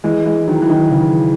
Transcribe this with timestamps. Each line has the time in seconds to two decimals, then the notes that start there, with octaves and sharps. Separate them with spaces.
0.04 E3 G#3
0.26 E3 G#3
0.48 D#3 F#3
0.62 E3
0.70 D#3
0.91 C#3